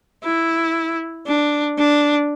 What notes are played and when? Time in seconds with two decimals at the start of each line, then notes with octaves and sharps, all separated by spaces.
0.24 E4
1.27 D4
1.78 D4